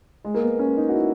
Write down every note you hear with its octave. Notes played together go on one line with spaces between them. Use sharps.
G#3
A#3
B3
C#4
D#4
F#4
E4